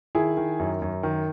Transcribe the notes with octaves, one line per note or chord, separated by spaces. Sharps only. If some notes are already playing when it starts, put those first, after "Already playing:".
D#3 E4 G#4
D#3
F#2
F#2
D#3